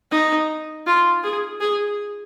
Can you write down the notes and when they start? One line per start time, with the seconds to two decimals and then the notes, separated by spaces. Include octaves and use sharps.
0.11 D#4
0.86 F4
1.23 G#4
1.61 G#4